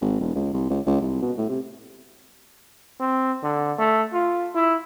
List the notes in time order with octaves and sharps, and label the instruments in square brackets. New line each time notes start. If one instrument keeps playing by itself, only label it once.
[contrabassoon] G#1
E1
C#2
C2
C#2
C#2
C2
B2
A2
C3
[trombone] C4
D3
A3
F4
E4